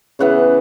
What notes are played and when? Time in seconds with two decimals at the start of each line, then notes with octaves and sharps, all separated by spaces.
0.19 C#3 E3 B3 F#5